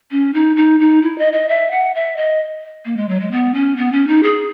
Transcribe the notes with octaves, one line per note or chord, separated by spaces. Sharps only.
C#4
D#4
D#4
D#4
E4
D#5
D#5
E5
F#5
E5
D#5
A#3
G#3
F#3
G#3
B3
C#4
B3
C#4
D#4
G#4